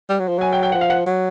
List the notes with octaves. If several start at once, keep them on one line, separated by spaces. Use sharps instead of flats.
G3
F#3
F3
F#3 G#5
G5
G5
F3 F#5
F5
F#5
F#3